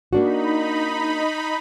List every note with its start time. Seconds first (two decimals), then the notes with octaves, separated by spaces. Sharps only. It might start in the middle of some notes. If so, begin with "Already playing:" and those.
0.13 A#3 D4 D#4 F#4 B5